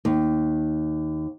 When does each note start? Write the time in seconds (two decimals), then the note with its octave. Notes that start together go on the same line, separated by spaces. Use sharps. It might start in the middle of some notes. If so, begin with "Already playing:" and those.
0.05 D#2